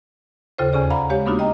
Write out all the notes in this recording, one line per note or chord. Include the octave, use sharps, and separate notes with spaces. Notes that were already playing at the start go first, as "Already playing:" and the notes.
D#2 C#3 F4 A4 C5
E2 C#3 C#4 G#4 D5
D5 F5 F#5 A#5 B5
G#3 G4 C#5 F5
A#3 B3 D4 D#4 F4 F#4
D#5 G5 A#5